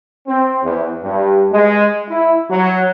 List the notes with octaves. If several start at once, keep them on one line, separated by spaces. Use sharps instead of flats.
C4
E2
G2
G#3
E4
F#3